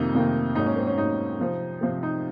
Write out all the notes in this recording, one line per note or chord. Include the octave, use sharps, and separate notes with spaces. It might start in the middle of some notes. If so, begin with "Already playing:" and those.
Already playing: F2 C3 D#3 A#3 D#4
F2 C3 D#3 A#3
G#2 F#3 A#3 D#4
C#4
C4
C#4
G#2 F#3 A#3 D#4
C3 F3 C4
C3 F3 C4
D#4